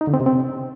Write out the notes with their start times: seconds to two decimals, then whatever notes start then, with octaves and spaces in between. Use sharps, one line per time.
0.01 D#4
0.07 D3
0.14 C4
0.20 C3
0.26 C4